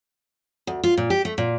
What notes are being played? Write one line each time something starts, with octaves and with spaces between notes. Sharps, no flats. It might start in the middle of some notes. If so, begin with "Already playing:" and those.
D2
F4
A#2
G4
A3
A#2